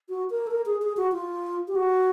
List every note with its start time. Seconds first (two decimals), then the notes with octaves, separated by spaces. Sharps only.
0.09 F#4
0.30 A#4
0.47 A4
0.51 A#4
0.66 G#4
0.82 G#4
0.97 F#4
1.12 F4
1.68 G4
1.75 F#4